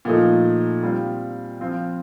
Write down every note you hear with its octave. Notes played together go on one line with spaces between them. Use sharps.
A#2 F3 A3 D#4
G3 C4 F4
F3 C4 F4